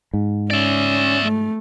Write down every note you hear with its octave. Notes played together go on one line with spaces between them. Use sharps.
G#2
C#4 D5 E5
A3